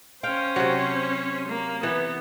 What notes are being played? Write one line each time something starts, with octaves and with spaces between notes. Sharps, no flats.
C#4 C5 F5 G5
C3 F#3
A#3
E3 B3